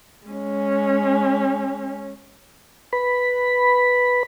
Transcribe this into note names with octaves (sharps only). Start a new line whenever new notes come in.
G#3 C#4
B4 B5